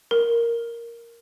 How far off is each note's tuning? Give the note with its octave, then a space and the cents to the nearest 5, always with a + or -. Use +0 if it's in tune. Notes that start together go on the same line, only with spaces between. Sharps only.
A#4 +0